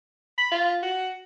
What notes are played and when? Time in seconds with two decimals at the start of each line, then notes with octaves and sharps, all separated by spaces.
0.38 B5
0.51 F4
0.83 F#4